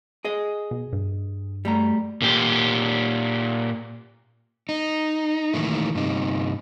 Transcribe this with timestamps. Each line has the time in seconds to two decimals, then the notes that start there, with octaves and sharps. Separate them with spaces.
0.25 G#4 D#5
0.71 B2
0.93 G2
1.65 G3 A3 A#5
2.22 A#2 G4
4.69 D#4
5.54 A#2 D#3 E3 A3
5.95 G2 C3 D#4